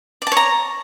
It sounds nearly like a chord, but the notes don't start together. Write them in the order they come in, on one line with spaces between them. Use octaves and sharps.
D5 A5 C#5 A#5